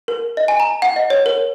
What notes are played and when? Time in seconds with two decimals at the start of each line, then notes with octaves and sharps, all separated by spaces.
0.08 A#4
0.37 D#5
0.48 G#5
0.60 A#5
0.82 F#5
0.96 D#5
1.10 C#5
1.26 A#4